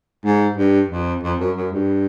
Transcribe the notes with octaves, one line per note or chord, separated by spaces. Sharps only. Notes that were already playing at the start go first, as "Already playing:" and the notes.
G#2
G2
F2
F2
F#2
F#2
G2